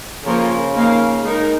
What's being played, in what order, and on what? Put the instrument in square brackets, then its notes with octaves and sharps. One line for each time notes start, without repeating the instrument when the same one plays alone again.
[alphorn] C#3 [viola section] F3 A#3 F4 A#4 C#5
[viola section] A#3 D#4 A#4 F5
G#3 D#4 A#4